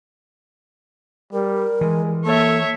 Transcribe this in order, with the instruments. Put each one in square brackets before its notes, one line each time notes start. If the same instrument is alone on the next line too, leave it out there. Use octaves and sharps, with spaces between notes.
[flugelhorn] G3 [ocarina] A#4
[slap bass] E3 [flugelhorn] G#3
[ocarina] A#3 [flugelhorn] A4 [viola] C#5 E5